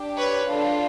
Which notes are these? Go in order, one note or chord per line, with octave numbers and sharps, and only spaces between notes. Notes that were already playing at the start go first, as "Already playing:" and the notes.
Already playing: D4 G4
B4 C#5
D4 F4 A4